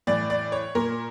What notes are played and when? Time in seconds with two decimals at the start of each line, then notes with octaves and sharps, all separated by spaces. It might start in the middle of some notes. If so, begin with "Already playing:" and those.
0.07 A2 E3 D5
0.30 D5
0.52 C#5
0.75 A#2 A#4